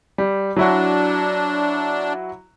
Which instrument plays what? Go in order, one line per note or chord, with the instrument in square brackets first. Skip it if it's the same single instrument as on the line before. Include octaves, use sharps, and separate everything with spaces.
[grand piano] G3
[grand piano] F#3 E4 F#4 [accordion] D4